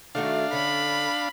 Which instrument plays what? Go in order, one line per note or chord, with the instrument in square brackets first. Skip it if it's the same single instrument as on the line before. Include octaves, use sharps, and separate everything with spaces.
[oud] D#3 A3 F#4 [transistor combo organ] D4 F5
[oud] D3 C#4 [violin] B5